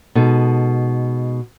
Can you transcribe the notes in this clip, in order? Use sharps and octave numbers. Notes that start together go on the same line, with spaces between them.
B2 G#3 D#4 A4